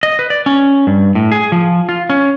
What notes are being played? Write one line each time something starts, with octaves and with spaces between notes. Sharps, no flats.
D#5
B4
D5
C#4
G2
A2
G#4
F3
F4
C#4